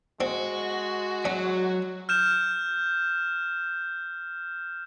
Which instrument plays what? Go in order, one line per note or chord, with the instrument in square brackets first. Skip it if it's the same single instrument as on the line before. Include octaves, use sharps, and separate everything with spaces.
[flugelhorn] G#3 [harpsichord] C4 [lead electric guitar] F#4
[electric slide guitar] F#3 [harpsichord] C#4
[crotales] F6 G6 E7